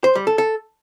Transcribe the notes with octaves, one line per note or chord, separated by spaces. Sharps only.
C5
G3
A4
A4